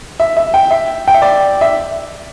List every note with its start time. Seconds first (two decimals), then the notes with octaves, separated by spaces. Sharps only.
0.20 E5
0.37 E5
0.54 G5
0.71 E5
1.08 G5
1.14 E5
1.22 D5
1.61 E5